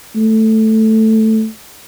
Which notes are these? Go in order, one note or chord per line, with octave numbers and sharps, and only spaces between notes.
A3